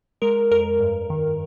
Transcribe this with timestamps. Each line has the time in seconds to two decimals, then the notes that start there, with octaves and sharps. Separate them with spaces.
0.22 G#3 A#4
0.51 F2 A#4
0.80 G2
1.10 D#3